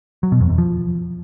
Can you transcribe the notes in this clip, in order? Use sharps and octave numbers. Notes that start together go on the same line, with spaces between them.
F#3
B2
F2
E2
F3